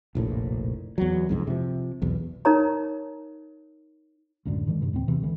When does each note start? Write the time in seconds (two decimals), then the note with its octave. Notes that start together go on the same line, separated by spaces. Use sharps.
0.15 F1 A#1 A2
0.98 E2 F#3
1.29 C2 F2 G#2
1.47 C3 F3
2.02 B1 E2
2.45 D#4 A#4 C#5 A#5
4.45 C#2 F#2 A2 D3
4.66 G#2 D3 E3 G#3
4.81 G2 C3 E3
4.93 D#2 A2 C4
5.08 E2 C3 E3
5.22 C#2 D3 E3